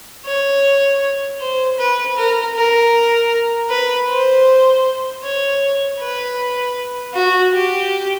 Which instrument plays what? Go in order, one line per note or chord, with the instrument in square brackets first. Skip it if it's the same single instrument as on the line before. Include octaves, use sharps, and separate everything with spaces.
[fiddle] C#5
C5
B4
A#4
A#4
B4
C5
C#5
B4
F#4
G4